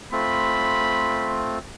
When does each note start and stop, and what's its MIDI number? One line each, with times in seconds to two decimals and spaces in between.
0.12 1.59 57
0.12 1.59 60
0.12 1.59 65
0.12 1.36 83